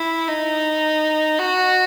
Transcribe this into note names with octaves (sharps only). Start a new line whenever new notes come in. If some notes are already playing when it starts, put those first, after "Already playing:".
Already playing: E4
D#4
F#4